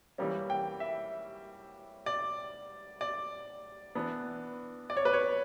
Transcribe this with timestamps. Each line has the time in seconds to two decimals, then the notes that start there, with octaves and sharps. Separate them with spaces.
0.18 E3 G3 A#3 C#4
0.50 G5
0.80 E5
2.06 D5
3.01 D5
3.95 E3 B3 D4
4.90 D5
4.97 C#5
5.05 B4
5.13 C#5